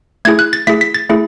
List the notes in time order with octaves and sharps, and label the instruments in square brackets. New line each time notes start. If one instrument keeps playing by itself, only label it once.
[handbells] A3 E4 G#4 G#6
F#6
A6
A3 E4 G#4 B6
B6
A6
A3 E4 G#4